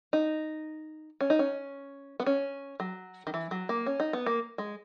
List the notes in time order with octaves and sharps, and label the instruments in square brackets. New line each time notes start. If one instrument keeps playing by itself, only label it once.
[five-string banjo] D#4
C#4
D#4
C#4
B3
C#4
F#3
D#3
E3
F#3
A#3
C#4
D#4
B3
A#3
G#3